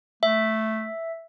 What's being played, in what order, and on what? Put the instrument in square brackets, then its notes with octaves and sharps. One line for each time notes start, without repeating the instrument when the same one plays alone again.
[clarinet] A3 [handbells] E5